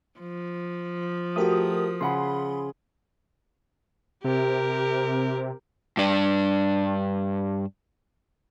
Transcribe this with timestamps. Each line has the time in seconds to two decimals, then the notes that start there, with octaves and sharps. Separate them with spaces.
0.20 F3
1.36 A3 F#4 G4 A#4 D#6
2.01 C#3 G#4 F#5 B5 C6
4.24 C3 G4 A#4
5.97 G2 D4